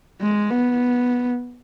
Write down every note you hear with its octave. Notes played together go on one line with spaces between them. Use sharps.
G#3
B3